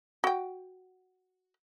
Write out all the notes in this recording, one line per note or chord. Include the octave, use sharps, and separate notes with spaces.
F#4 G5